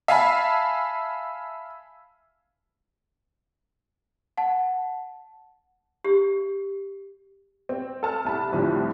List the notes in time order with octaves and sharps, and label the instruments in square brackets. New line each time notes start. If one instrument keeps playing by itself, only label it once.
[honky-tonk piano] E5 F5 G#5 A5 B5
[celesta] F#5 A5
[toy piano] G4
[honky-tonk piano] C4
A4 A5 F6
C2 A5 B5
C2 F2 A2 D3 F3 G3